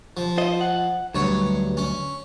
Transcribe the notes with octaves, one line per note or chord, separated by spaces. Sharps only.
F3
F4 C5 D#5
F#5
D2 G2 F#3 C#5
C#4